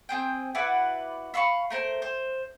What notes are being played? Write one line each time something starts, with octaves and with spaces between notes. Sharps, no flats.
C4 G#4 G5
E4 F#4 B4 D5
E5 F5 B5 C#6
A3 A#4 C5
C5